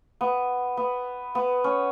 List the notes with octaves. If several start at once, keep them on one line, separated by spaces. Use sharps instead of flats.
B3
B3
B3
C#4